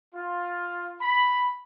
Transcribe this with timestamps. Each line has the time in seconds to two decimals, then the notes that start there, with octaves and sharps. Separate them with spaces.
0.14 F4
1.01 B5